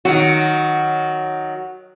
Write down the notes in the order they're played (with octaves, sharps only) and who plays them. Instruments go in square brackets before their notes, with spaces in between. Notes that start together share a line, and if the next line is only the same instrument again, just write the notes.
[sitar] D#3 F#3 [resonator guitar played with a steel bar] F#4